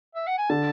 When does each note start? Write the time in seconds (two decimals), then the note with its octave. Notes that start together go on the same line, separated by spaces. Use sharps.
0.15 E5
0.27 F#5
0.38 G#5
0.50 D3 A5